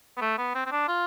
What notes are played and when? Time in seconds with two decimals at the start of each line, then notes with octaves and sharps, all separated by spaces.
0.17 B3
0.21 A3
0.38 B3
0.55 C4
0.66 C4
0.72 D4
0.88 F4